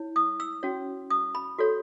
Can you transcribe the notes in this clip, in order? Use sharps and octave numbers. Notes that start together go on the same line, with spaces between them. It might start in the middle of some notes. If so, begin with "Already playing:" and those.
Already playing: E4 C#5
D#6
E6
C#4 F#4 C#5
D#6
B5
F#4 A4 C#5